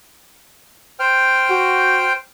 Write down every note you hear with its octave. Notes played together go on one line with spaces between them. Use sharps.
C5 G5 F6
F#4